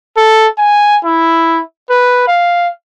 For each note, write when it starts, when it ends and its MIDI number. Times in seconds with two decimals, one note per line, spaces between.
0.17 0.48 69
0.58 0.97 80
1.04 1.61 64
1.90 2.27 71
2.27 2.69 77